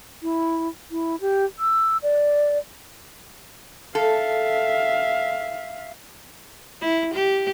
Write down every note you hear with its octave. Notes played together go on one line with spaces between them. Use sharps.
E4
E4
G4
E6
D5
A4 E5 F5
E4
G4